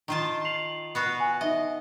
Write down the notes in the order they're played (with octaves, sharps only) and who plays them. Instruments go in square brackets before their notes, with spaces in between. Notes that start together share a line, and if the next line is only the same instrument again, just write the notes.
[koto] D#3 F4 A5
[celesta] C7 F7 F#7
[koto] B3 F#4 F5
[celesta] G#5
[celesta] D#4 E5 [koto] D#5